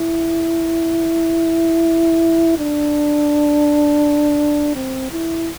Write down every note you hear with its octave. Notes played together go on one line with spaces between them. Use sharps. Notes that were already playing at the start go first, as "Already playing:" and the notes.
Already playing: E4
D4
C4
E4